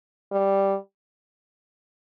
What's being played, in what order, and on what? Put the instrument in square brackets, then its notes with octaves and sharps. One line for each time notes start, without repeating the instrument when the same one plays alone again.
[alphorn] G3